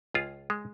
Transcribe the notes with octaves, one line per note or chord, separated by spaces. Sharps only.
C#2 F4 G#4
G#3